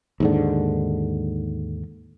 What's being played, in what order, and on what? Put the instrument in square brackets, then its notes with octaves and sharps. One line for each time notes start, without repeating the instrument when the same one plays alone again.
[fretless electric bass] D#2 G#2 D3